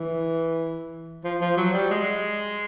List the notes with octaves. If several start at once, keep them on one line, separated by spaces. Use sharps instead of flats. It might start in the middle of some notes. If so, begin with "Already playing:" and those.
Already playing: E3
F3
F3
F#3
G3
G#3